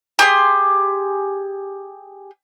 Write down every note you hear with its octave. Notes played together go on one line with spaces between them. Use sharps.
G4 G#4 C6